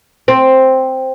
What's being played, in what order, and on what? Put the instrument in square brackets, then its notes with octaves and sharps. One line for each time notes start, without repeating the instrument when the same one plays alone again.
[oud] C4